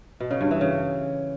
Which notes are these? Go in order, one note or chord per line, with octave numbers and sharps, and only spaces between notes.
B2
C#3
G2
E3
C#3